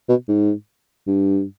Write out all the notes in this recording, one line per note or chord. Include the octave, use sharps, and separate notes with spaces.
B2
G#2
G2